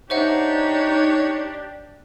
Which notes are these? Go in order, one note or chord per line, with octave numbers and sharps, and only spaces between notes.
D4 D#4 G4 C5 C#5 E5 F#5